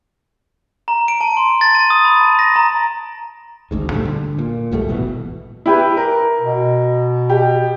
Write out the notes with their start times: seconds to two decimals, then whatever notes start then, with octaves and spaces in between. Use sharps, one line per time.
0.88 A#5
1.08 D7
1.21 A5
1.37 C6
1.61 A6
1.75 D#7
1.90 D#6
2.05 B5
2.21 A5
2.39 A#6
2.56 A#5
3.71 G#1 D2 G#2
3.92 A#2 D3 G3 A3
4.05 D3
4.38 A#2
4.71 B1 G#2 G3 A3
4.88 D#1 A#1 B2 E3
5.66 E4 G4 B4
5.97 A#4
6.41 B2
7.30 G4